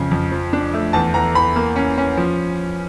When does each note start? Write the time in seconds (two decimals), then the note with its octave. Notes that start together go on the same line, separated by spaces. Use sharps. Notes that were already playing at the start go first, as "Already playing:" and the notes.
Already playing: F2 C#3
0.11 F2
0.31 F3
0.53 D4
0.74 A3
0.93 E2 A5
1.14 E2 A#5
1.35 E2 B5
1.56 A#3
1.76 C#4
1.98 C#4
2.17 F3